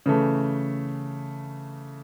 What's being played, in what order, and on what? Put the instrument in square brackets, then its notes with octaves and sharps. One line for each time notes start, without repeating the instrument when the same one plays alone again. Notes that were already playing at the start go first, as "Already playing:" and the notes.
[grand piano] C#3 E3 A3